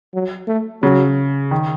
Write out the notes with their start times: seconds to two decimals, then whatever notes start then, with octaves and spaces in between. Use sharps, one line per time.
0.14 F#3
0.48 A3
0.82 C#3 F#3
1.51 D#3